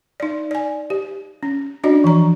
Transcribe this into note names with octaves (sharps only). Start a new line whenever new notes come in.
D#4 D5
D5 G#5
G4
C#4
C#4 D4 F#4 D5 D#5
E3 F3 A#5